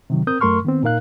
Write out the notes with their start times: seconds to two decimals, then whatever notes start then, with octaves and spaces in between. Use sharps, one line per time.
0.10 C3 D#3 F#3
0.27 C4 A#4 D#6 G6
0.41 F#2 A3 A#4 C6 C#6 F6
0.64 D#3 B3 C4
0.83 A#2 D#4 A#4 F5 F#6